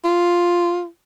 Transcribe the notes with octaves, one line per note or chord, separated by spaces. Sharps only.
F4